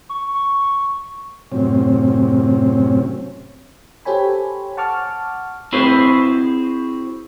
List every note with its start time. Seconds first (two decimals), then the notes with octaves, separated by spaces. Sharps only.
0.09 C#6
0.34 C#6
1.52 F#2 A2 C3 C4 C#4
4.05 G4 A4 C5 C#5 G#5 B5
4.77 F#5 A5 C#6 D6 F6
5.72 C4 E4 F#4 G#4 B4 C5